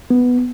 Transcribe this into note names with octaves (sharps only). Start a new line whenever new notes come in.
B3